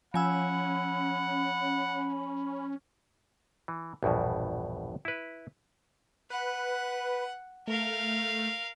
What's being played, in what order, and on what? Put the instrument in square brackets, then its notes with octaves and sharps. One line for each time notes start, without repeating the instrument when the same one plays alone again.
[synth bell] F3 G#5 E6 [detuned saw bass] C#4 [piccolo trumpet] F#5 [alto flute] B5
[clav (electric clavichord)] E3
A#1 E2 G2 B2
E4 B4
[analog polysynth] B4 [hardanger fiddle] F#5
[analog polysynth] A3 [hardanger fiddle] A#4 F5